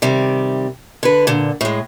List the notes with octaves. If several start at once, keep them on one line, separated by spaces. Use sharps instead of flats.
C3 D#3 G3
D3 B4
A#2 D3
A2 G#3